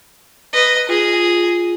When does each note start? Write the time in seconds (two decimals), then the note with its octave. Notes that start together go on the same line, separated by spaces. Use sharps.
0.53 B4 D#5
0.89 F4 G#4